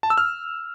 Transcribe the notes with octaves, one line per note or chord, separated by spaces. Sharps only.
A5
E6
F6